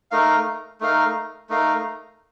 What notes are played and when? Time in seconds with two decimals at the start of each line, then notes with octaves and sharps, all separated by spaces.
0.11 A3 D#4 A#4 F5
0.81 A3 D#4 A#4 F5
1.49 A3 D#4 A#4 F5